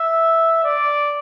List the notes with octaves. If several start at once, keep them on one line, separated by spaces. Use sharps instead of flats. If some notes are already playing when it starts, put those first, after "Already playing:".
Already playing: E5
D5